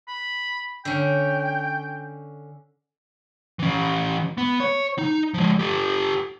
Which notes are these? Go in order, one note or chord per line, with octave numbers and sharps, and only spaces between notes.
B5
D3 C#4 G5
E3 C#4
B3
C#5
D#4
F3 G#3
G4 A4